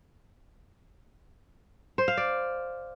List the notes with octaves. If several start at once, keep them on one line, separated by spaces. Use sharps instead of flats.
C5
F5
D5